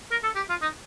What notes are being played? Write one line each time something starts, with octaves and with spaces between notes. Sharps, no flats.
A#4
A4
G4
F4
D#4